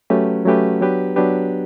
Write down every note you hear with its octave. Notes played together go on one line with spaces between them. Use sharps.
F#3 A3 C#4 G4 B4
F#3 A3 C#4 G4 B4
F#3 B3 D4 G4 B4
F#3 B3 D4 G4 B4